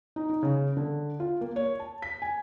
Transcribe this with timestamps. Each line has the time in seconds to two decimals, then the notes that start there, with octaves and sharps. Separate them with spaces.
0.16 D#4
0.30 D#4
0.43 C#3
0.77 D3
1.20 F4
1.41 A#3
1.56 C#5
1.80 A5
2.02 B6
2.22 G#5